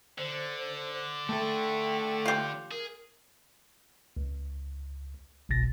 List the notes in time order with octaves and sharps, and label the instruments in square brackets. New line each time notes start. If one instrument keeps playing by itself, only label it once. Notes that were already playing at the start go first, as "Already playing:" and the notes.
[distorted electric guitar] D3 [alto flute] C5
[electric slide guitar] A3 A4 [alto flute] G5
[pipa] F4 G4
[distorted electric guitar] G#4 [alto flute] A#4
[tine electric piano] C#2
G1 C2 B2 A6 A#6